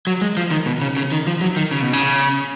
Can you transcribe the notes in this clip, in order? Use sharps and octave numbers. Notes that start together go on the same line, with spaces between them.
F#3
G#3
F3
D#3
B2
C#3
C#3
D#3
F3
F#3
D#3
C#3
B2
C#3